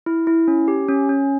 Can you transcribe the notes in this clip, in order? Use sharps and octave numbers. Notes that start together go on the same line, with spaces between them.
E4
E4
C#4
G4
C#4
C#4